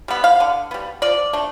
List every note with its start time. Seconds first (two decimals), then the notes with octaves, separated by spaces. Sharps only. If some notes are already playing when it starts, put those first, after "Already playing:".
0.08 G3 B3
0.24 F5
0.40 D3
0.71 G3 B3
1.02 F3 D5
1.33 A3 D4